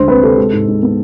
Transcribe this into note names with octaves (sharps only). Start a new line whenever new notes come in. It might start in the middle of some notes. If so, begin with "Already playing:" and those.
Already playing: D2 G#3 C5
C4 B4
C3 A4
G#3
G#2
G#2
B3